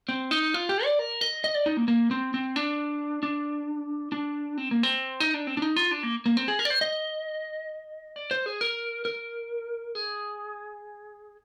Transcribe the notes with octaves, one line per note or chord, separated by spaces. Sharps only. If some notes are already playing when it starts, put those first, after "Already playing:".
C4
D#4
F4
G4
D5
A#4
D#5
D#5
D5
D#4
A#3
A#3
C4
C4
D4
D4
D4
C4
A#3
C4
D#4
D4
C4
D4
D#4
F4
D4
A#3
A#3
C4
G#4
A#4
D5
C5
D#5
D5
C5
G#4
A#4
A#4
G#4